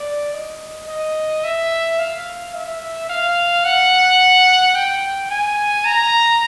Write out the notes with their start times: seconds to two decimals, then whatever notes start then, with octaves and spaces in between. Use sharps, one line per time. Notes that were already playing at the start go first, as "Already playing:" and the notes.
Already playing: D5
0.34 D#5
0.88 D#5
1.44 E5
1.99 F5
2.54 E5
3.09 F5
3.65 F#5
4.75 G5
5.30 G#5
5.85 A#5